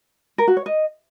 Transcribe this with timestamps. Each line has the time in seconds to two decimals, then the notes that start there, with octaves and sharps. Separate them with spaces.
0.38 A#4
0.48 F#4
0.57 C#5
0.66 D#5